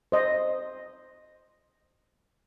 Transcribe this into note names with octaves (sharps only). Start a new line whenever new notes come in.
C5 D#5